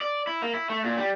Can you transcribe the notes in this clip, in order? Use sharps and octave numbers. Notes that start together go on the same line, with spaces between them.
D5
E4
A#3
E4
A3
A#2
G3